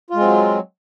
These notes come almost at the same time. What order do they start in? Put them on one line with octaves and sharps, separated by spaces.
F4 G#3 C4 F#3